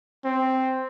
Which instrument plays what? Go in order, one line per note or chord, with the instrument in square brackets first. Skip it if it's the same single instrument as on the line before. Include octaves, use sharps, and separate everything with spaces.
[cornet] C4